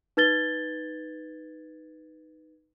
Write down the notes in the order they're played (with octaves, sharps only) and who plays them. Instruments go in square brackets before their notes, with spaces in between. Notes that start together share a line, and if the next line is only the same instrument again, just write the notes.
[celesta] D#4 B4 G#6 A6 G7